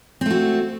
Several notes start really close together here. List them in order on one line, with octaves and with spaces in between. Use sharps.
C4 A3 F#4